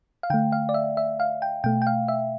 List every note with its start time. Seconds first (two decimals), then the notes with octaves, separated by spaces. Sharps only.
0.23 F5
0.30 D3 A3 G5
0.52 F5
0.69 D5
0.74 E5
0.97 E5
1.20 F5
1.42 G5
1.64 B2 A3 G5
1.82 G5
1.87 F5
2.08 E5